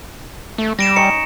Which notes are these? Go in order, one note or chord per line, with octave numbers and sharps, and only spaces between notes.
A3
G3 A#6 D7 E7
C#4 D#4 C#7